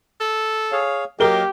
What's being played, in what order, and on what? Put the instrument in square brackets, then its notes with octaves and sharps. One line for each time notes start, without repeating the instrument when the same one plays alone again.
[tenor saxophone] A4
[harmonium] G#4 C#5 F5
[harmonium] F#3 D#5 [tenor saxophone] A#3 [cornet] G4 [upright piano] A#4 G7